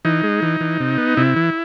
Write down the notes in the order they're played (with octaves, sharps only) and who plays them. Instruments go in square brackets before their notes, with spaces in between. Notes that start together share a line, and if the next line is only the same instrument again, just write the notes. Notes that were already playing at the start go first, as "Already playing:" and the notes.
[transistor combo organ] E3 D#4
G#3
E3
E3
C3
B3
C3 E4
E3